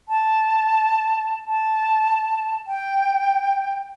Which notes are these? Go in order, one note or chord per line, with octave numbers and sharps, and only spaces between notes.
A5
A5
G5